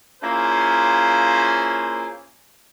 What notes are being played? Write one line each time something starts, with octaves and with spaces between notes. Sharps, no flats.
A#3 C#4 E4 F4 G#4 C5